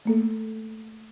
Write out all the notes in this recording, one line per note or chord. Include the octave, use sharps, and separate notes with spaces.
A3 A#3 A4